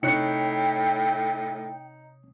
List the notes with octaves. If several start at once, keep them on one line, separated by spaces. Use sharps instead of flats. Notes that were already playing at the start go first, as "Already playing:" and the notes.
A2 C3 D#4 C#5 G5 F#6 C#7